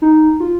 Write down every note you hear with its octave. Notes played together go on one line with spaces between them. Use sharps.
D#4
F4